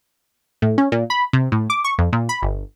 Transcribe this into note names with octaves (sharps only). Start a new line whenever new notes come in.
A2
C#4
A#2
B5
C3
A2
D6
C#6
F2
A#2
B5
G1